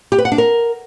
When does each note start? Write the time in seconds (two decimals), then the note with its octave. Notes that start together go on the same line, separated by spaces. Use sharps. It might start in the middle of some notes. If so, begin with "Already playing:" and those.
0.12 G4
0.18 B4
0.25 F#5
0.32 D4
0.38 A#4